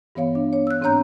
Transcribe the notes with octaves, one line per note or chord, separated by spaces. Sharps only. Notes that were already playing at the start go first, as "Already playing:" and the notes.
G2 E3 B3 C#5 F5
D4
C#5
E6 F#6
G#2 C4 D4 C#5 A#5 G6